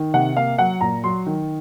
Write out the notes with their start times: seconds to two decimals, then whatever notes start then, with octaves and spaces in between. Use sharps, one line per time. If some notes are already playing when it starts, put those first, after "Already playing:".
Already playing: D#3
0.14 C3 F#5
0.36 A#3 F5
0.58 F#3 F#5
0.81 A#2 A#5
1.04 F#3 C6
1.26 D#3